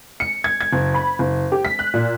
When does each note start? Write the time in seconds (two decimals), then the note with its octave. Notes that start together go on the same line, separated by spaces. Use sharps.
0.20 C#7
0.44 G#6
0.61 G#6
0.73 F#1
0.94 B5
1.19 F#1
1.52 G4
1.65 B6
1.79 F#6
1.94 A#2